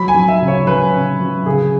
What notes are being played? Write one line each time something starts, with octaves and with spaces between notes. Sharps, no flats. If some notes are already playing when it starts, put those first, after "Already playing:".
Already playing: F#3 B5
G#5
F#3
E5
C#3
C#5
F#3 B4
C#3
F#3
C#3 G#4